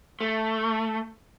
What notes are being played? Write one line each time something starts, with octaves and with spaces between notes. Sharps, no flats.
A3